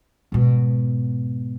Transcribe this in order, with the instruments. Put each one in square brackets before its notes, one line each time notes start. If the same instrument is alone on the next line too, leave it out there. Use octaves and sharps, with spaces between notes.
[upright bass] G#2 B2